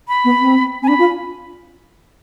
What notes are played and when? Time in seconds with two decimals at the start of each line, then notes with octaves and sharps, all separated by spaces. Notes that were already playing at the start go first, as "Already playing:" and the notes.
0.08 B5
0.25 B3
0.41 C4
0.82 C4 G#5
0.88 D4 B5
0.99 F4